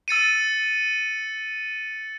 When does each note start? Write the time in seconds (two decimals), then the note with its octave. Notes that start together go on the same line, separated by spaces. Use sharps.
0.08 E6 A6 C#7 D#7